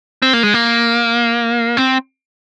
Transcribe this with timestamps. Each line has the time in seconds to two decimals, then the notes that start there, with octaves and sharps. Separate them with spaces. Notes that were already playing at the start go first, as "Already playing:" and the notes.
0.22 C4
0.33 A#3
0.43 G#3
0.54 A#3
1.77 C4